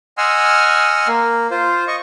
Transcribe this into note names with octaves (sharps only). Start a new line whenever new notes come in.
D#5 F#5 G#5 C6 E6 F6
A#3
F4 C5
D#5 C#6